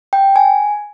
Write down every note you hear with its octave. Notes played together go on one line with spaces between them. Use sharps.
G5
G#5